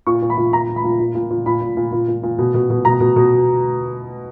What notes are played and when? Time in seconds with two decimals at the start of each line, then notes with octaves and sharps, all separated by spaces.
0.07 A#2 C#6
0.22 A#2
0.30 B5
0.38 A#2
0.53 A#2 A#5
0.69 A#2
0.76 B5
0.84 A#2
1.00 A#2
1.15 A#2
1.31 A#2
1.46 A#2 B5
1.61 A#2
1.77 A#2
1.92 A#2
2.08 A#2
2.23 A#2
2.38 B2
2.54 B2
2.70 B2
2.85 B2 A#5
3.00 B2
3.16 B2